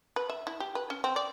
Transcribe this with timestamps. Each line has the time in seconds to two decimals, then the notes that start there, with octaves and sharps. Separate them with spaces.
0.16 B4
0.29 E5
0.47 E4
0.60 G4
0.75 B4
0.90 C#4
1.04 C4
1.16 D5